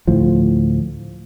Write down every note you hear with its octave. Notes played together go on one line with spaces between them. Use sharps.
D2 A2 F3